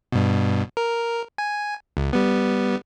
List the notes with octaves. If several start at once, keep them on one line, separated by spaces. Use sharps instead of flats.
G2 B2
A#4
G#5
C#2
G3 B3